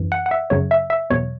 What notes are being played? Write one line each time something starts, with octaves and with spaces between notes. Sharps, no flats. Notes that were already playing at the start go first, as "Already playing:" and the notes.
Already playing: F#2 E3
F#5
F#5
E5
F#2 C#3 F#3 C#5
E5
E5
E2 B2 F#3 C#5